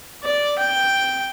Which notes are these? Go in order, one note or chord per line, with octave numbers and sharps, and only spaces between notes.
D5
G5